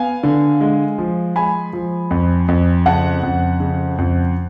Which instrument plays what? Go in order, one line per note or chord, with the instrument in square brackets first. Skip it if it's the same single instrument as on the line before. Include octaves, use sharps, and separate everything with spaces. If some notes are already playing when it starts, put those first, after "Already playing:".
Already playing: [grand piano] B3 F5 G#5
D3
G#3
F3
G#3 G#5 B5
F3
F2
F2
C#3 F#5 A5
F2
C#3
F2